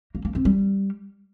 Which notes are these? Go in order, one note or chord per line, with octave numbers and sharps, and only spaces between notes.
A#3
A#3
C4
G3